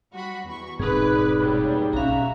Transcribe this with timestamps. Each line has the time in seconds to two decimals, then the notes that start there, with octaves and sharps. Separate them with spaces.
0.13 G3 F#4 B5
0.46 E2 C#6
0.79 E1 G#2 C4 D#4 G#4 B4 D5
1.38 A#2 F#3 G3
1.93 B1 C#4 F#4 E5 F5 A#5